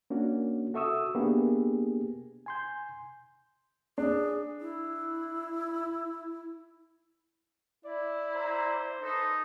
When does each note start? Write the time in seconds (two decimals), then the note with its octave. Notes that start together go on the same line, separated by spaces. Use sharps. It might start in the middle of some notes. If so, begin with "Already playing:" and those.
0.10 A#3 C#4 D4 F#4
0.74 F#4 A4 E5 C#6 D#6 E6
1.15 A#3 B3 D4 G4 G#4
2.46 G#5 C6 G6
3.98 D4 G#4
4.61 E4
7.85 E4 D5
8.34 C5 A#5
9.01 D#4 A4 B4